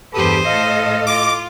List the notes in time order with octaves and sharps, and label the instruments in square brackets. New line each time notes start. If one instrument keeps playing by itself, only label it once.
[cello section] E2 G2 G4 [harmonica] A4 B4 [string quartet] C5 D#6
[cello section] A2 A4 D#5 [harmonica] F5
[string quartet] F4 [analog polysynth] D6